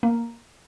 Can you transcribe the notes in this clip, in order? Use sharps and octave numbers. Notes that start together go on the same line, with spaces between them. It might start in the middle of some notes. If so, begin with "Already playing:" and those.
A#3